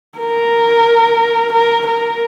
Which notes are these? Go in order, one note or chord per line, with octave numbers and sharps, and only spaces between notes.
A#4
A#4
A#4